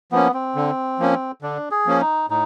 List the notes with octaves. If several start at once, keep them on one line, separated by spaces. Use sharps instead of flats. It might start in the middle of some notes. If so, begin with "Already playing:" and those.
F3 A#3 B3 C#4
C4
D3
F3 A#3 C#4
D3 D4
G#4
F3 A#3 C#4
D#4
A2 D#4